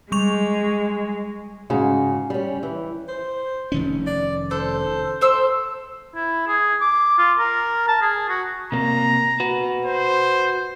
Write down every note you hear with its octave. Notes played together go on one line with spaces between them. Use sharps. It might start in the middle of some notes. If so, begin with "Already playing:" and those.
G3 G#3 C#6 F7
G#2 C#3 F#4
G3 C#4
E3
C5
F1 D#3 C#4
D5
A4 C5
A4 C5 E6
E4
G#4
D6
F4
A#4
A5
G#4
F#4
C3 A#3 A#5
F#4 B4
C5